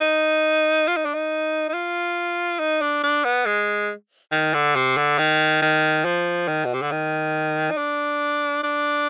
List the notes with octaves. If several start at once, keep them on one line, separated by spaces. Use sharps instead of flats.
D#4
F4
D#4
D4
D#4
D#4
F4
D#4
D4
D4
B3
G#3
D#3
D3
C3
D3
D#3
D#3
F3
D#3
B2
C3
D3
D#3
D#4
D4
D4